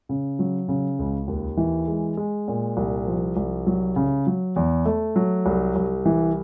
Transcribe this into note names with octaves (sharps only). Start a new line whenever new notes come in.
C#3
F#3
C#3
C#2
D#2
E3
G#3
G#3
A#2
C2
F3
C2
F#3
C#3
F#3
E2
A3
F#3
C2
C2
E3